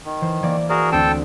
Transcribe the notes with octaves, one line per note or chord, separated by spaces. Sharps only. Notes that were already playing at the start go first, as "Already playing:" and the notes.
D#3
E3 C5
E3 A#3 D5
F#4 G#4 A#4 D5 A5
D2 C4 A4 G5 A5